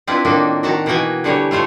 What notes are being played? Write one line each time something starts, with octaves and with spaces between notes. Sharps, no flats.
C4 D4 E4 F4 B4
A2 D#3 A#3 D4 D#4
D#3 F#4 A5 A#5
B2 E3 A#3 F#4 G5 G#5
D3 E3 G3 A3 C#5
A3 F4 C5 C#5